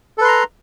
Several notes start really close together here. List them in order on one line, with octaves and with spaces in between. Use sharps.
A4 B4 C6 A#5